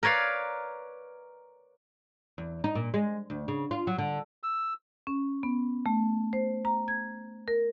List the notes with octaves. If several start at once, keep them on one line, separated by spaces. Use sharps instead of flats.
A#4 B4 C#5 D5 F5
E2
D#4
A#2
G#3
D2
C#3
F4
F#3
D3
E6
C#4
B3
A3
C5
A#5
G#6
A#4